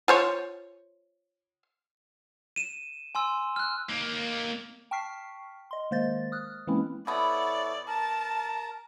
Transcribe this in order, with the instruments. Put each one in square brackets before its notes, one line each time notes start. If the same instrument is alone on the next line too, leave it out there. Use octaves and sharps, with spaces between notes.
[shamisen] F4 C5 C#5
[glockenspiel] D#7 E7
G#5 C6 E6
F6 F#6
[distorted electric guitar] A#3 D#4
[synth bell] G5 A5 C#6 F6 B6 C7
D#5 C6
D#3 G#3 A#3 C5 D#5 A6
D#6 F6 F#6
E3 G#3 A#3 C4 C#4 E4
[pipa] B2 B3 [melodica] E4 A4 C#5 [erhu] D5
[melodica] A#4 A#5 [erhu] A5